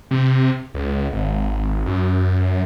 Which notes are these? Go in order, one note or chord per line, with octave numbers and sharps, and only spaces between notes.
C3
C#2
G#1
F#2